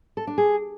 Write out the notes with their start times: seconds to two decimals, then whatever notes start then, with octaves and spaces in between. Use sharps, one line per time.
0.17 A4
0.27 D4
0.38 G#4